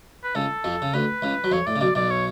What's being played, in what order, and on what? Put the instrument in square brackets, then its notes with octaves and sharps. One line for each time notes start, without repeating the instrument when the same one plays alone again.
[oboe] B4
[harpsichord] C#2 C#3 [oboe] A4
[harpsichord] F2 F3
C#3
[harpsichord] D2 D3 [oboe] B4
[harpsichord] C#2 C#3
F#3
[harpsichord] F2 F3 [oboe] C#5
[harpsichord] A2 [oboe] D5
[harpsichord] C#3
[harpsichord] B1 B2 [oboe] D5
[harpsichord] B1 B2 [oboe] D5
[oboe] C#5